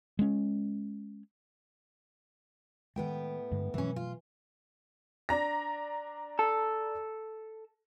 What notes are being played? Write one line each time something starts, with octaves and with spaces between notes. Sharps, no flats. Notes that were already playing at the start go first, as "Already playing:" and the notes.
G#3 C#4
A2 D#3 G#3 B3 G5
G2 D3 G#3
B2 E3 F#3 A3 C#4
F4
D4 A#5 A#6
A4